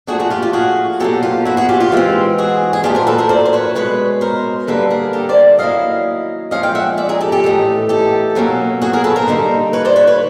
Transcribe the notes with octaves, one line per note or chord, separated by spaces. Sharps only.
A#2 F3 A3 D4 F#4 G#4
F#4 G#4
F4 G4
F4 G4
F#4 G#4
B2 F#3 A#3 G4 A4
F4 G4
E4 F#4
F#4 G#4
F4 G4
F4 G4
E3 G#3 C4
F#4 G#4
G#4
A#2 F#3 A3 D4 F4 G4
A#4 C5
A4 B4
A#4 C5
C5 D5
C5
B4 C#5
B2 G#3 C#4 B4 C#5
A#4 C5
D3 G3 A#3 D4 A4 B4
G#4 A#4
G4 A4
C5 D5
D#3 F#3 A#3 C#4 E4 D#5 F5
A#2 F3 G#3 C#4 D#5 F5
F5 G5
E5 F#5
D5 E5
G#4 A#4
G4 A4
G4 A4
A2 E3 A3 C4 D#4
G4 A4
B2 F#3 A#3 C#4
F#4 G#4
G#4 A#4
A4 B4
A#4 C5
D3 G3 A#3 D#4
B4 C#5
C5 D5
B4 C#5
B4 C#5